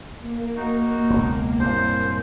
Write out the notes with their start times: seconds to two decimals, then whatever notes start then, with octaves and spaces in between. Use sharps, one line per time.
0.18 A#3
0.56 D#4 F#4
1.10 E1 C#2
1.59 C2 F#2 A#2 C5